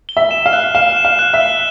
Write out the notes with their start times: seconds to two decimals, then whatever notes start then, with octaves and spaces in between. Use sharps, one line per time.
0.09 G7
0.17 E5
0.31 E7
0.46 F5
0.53 F#6
0.75 F5 E7
0.97 E7
1.05 F5
1.19 F#6
1.34 E5
1.40 G7